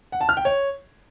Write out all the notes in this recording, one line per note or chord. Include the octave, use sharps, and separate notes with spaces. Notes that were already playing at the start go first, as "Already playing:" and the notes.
F#5
A5
F6
G5
C#5